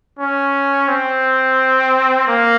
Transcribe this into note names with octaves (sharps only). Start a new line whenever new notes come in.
C#4
C4
A#3